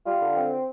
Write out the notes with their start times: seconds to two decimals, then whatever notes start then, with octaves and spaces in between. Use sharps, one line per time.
0.06 G3 F4
0.21 D3
0.36 C4